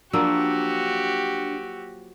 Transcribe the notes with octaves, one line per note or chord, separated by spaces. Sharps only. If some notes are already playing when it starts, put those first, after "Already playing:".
F3 F#3 A#3 D4 F#4 G4 E6